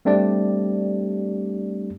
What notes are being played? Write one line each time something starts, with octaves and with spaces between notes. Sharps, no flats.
G3 A3 C4 D4 G4 D5